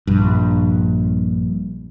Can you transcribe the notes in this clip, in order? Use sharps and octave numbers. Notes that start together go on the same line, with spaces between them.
A#1 G2